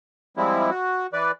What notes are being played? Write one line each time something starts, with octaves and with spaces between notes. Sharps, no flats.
F3 G3 G#3 C4 E4
F#4
E3 B4 D5